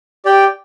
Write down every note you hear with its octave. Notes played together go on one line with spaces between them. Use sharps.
G4 D5 G5